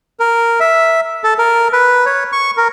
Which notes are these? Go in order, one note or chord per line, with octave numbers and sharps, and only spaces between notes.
A#4
E5
A4
A#4
B4
C#5
C#6
A#4